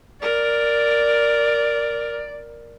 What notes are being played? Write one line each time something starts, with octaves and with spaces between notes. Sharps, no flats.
A#4 D5